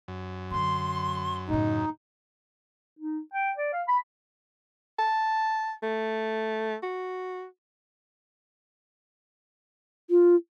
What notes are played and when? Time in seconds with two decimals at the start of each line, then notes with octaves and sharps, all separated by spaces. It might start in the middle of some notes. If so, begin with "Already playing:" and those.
0.08 F#2
0.51 D3 F#3 C6
1.49 A2 C#3 D#4
2.99 D#4
3.33 G5
3.57 D5
3.73 F5
3.88 B5
4.99 A5
5.83 A3
6.83 F#4
10.10 F4